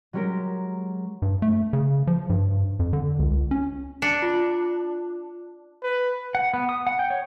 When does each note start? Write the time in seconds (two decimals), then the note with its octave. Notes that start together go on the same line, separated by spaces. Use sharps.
0.13 F#3 G#3 C#4 G4 A#4
1.22 G2
1.42 A3
1.73 C#3
2.07 F3
2.30 G2
2.79 F2
2.93 D3
3.19 C#2
3.31 C#2
3.51 C#4
4.02 D4 C#7
4.22 F4
5.83 B4
6.35 F#5
6.54 B3
6.69 D#6
6.87 F#5
6.99 G5
7.10 C#5